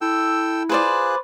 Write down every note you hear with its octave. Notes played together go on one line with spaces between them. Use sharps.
E4 A4 G5 E6
F4 G#4 B4 C5 D5 F#6